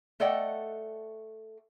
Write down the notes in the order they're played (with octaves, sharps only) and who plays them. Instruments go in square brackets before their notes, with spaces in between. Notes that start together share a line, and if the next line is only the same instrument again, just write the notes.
[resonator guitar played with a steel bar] A3 A4 D5 D#5 F#5 G5